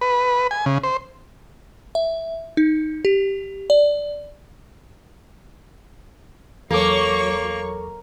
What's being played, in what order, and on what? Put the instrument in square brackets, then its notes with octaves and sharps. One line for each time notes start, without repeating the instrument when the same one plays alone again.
[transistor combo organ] B4
G#5
C#3
C5
[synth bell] E5
D#4
G4
D5
[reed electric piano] E2 A4 D6 [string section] F#3 C#5 C#6 [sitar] A#3